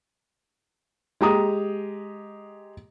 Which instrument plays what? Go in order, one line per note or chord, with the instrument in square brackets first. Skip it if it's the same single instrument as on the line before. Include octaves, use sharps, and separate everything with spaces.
[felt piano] G#3 G4 A#5 D#6